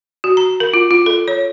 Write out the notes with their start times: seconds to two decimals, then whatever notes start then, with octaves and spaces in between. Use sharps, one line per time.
0.24 F#4
0.37 A#5
0.60 A#4
0.74 F4
0.91 F4
1.06 A4
1.28 C#5